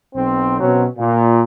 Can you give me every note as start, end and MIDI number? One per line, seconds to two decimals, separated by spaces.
0.15 0.59 35
0.15 0.59 60
0.60 0.85 47
0.60 0.85 54
0.60 0.85 60
0.60 0.85 61
0.97 1.42 46